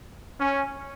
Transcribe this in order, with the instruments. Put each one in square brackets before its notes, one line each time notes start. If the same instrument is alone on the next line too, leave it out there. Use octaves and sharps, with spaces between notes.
[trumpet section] C#4